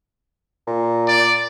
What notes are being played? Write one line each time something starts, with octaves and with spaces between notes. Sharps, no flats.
A#2
D5